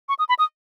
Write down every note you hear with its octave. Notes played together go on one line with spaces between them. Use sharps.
C#6
D#6
B5
D#6